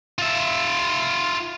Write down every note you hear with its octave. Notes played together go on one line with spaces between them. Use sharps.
F4 E5